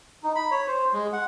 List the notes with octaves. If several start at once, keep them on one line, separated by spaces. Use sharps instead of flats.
D#4
B5
C#5
C5
G#3
F#5